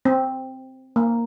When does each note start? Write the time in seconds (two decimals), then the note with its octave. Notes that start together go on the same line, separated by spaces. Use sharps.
0.05 C4
0.96 A#3